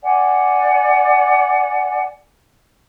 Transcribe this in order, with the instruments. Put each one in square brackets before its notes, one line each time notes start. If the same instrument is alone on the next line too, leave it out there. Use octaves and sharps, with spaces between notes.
[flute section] D5 F#5 G#5